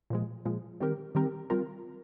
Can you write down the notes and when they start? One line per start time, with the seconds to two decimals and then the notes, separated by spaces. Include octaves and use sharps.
0.10 A#2 F3 G#3
0.45 A#2 F3 G#3
0.80 D#3 G3 C4 G4 A#4
1.15 D#3 G3 C4 G4 A#4
1.50 G3 C4 F4 A#4